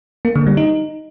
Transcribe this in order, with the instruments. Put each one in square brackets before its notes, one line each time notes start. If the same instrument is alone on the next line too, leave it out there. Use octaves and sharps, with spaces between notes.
[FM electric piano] A#3
D3
G3
D#4